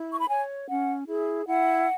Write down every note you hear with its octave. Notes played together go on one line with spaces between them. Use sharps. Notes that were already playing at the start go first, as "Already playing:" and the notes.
Already playing: E4
C#6
B5
C#5 G#5
C#4 F#5
E4 G#4
E4 F#5